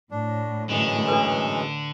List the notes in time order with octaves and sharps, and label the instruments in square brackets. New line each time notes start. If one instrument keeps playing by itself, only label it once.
[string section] A2 [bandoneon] D4
[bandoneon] F#2 E3 G#3 [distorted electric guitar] D3
[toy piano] D4 A4 B4